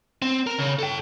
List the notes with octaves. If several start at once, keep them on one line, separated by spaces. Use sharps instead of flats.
C4
A#4
C#3
A4 G5